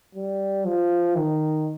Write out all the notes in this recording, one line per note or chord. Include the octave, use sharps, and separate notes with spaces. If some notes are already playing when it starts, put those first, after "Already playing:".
G3
F3
D#3